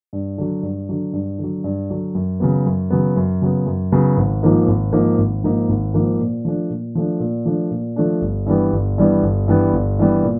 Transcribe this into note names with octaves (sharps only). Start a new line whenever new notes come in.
G2
D3 F#3
G2
D3 F#3
G2
D3 F#3
G2
D3 F#3
F#2
C#3 F#3 B3
F#2
C#3 F#3 B3
F#2
C#3 F#3 B3
F#2
C#3 F#3 B3
G#1
G#2 F3 A#3 D#4
G#1
G#2 F3 A#3 D#4
G#1
G#2 F3 A#3 D#4
G#1
G#2 F3 A#3 D#4
A#2
F3 A3 D4
A#2
F3 A3 D4
A#2
F3 A3 D4
A#2
F3 A3 D4
G1
G2 E3 G3 B3
G1
G2 E3 G3 B3
G1
G2 E3 G3 B3
G1
G2 E3 G3 B3
A#2